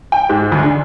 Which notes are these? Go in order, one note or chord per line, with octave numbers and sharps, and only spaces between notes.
G5
G#2
D2
D3